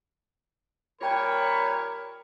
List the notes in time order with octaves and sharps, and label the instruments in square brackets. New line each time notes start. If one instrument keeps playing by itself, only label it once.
[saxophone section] A#2 G3 C#5 [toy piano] F4 G5 A5 [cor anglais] A#4 [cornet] B5